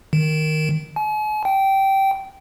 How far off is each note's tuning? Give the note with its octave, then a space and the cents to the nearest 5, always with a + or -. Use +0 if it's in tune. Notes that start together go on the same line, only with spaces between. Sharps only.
D#3 -5
G#5 +45
G5 -15